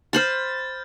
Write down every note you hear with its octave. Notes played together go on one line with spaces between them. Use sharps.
C5 B5 C6 F6 G6 A6